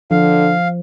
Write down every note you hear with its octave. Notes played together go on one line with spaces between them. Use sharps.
D3 F3 F5